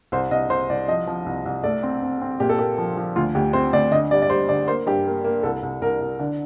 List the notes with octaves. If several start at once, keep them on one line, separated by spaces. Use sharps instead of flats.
C2 C5
C2 D#5
C2 C5
C2 D5
F3 D#5
F3
C2
C2
A3 D5
C4
C4
C4
A#2 G4
A4
A#3 G4
F3
F3
D2 F4
D2 G4
C4 C5
D2 D5
D3 D#5
G3 D5
D5
G3 C5
D3 D5
A#3 C5
G2 G4
A#3
A#3
C2 A4
C2
C2 A#4
C2
D3